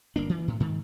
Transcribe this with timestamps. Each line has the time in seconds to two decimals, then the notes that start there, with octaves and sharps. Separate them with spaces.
0.16 G1 A#3 D4
0.29 E3
0.48 A2
0.60 G#2 D#3